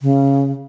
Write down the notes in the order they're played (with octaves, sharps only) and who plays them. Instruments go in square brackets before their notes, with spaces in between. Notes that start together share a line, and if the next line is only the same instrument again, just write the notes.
[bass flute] C#3